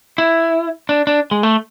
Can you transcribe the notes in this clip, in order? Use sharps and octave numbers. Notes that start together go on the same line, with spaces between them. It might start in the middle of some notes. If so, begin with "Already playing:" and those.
E4
D4
D4
G#3
A3